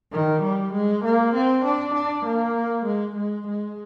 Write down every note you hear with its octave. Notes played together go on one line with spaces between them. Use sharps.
D#3
G3
G#3
A#3
C4
D4
D4
A#3
G#3
G#3
G#3